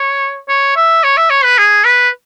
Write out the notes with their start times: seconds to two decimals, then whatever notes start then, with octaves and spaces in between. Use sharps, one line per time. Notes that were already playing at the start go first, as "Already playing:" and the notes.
Already playing: C#5
0.48 C#5
0.76 E5
1.04 C#5
1.17 E5
1.30 C#5
1.44 B4
1.58 G#4
1.85 B4